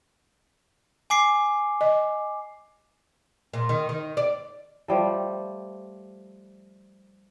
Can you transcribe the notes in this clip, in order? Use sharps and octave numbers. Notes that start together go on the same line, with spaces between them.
G#5 D6 C7
D#5
A#2
D#3
D#3
D5
F3 G3 A3